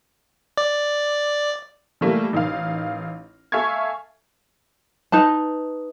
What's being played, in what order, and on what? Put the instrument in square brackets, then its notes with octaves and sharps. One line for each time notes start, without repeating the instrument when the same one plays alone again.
[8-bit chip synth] D5
[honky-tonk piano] E3 G3 A3 A#3
A1 D#4 A#4 F5
A4 E5 F5 G#5 C#6 G#6
[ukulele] D#4 B4 A5